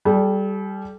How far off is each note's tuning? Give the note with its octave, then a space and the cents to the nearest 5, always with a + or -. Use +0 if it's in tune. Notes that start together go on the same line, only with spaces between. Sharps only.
G3 -5 A4 -40